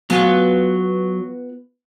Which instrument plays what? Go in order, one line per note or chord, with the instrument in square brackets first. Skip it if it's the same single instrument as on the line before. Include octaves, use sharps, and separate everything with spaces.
[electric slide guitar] F#3 [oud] B3 F4 G#4